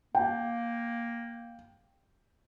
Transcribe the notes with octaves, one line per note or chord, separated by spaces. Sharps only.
A#3 G5